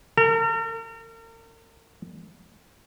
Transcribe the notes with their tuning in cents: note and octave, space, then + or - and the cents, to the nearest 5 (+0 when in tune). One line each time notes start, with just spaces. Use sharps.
A#4 -40